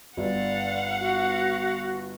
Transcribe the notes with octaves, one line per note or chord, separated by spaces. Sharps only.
G1 D5 F5 F#5
F#4